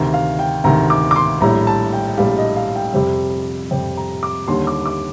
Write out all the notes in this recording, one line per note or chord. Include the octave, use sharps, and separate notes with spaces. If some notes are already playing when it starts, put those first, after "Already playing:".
Already playing: D2 C3 D#3 A#5
F5
G5
D2 C3 D#3 A#5
D6
D6
C6
A#1 A2 G3 A#5
A5
G5
A#1 A2 G3 F5
D#5
F5
G5
F2 C3 G3
F2 C3 G3 G5
A#5
D6
D#2 D3 G3 C6
D6
D6